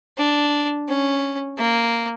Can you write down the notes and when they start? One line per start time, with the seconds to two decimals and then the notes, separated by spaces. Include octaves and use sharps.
0.18 D4
0.88 C#4
1.58 A#3